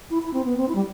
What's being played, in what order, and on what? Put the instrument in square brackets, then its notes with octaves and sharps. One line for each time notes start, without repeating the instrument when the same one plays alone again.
[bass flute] E4
E4
C4
B3
C4
E4
G3